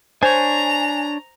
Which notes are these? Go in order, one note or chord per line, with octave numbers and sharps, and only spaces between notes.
D4 C5 C#5 G#5 A#5